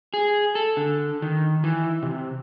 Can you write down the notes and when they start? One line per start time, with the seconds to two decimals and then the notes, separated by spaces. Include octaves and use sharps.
0.14 G#4
0.55 A4
0.77 D3
1.22 D#3
1.64 E3
2.03 C3